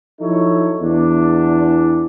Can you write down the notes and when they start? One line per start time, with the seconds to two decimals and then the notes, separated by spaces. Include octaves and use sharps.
0.20 F3 F#3 D#4 E4 A4 C#5
0.81 E2 D4